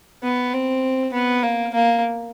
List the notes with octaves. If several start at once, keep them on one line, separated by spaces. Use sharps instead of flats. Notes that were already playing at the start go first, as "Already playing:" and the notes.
B3
C4
B3
A#3
A#3